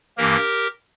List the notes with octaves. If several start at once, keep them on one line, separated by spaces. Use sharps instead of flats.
G2 E3 A#3 G4 A#4